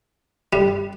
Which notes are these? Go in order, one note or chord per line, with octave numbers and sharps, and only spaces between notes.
G3